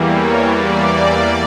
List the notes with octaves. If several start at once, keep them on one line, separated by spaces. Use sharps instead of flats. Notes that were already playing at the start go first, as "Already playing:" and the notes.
Already playing: E2 E3 G3 A#3
C#5
D5